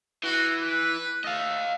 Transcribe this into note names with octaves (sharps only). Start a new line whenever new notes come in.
E3 F#4
B4
A3 D#5 F5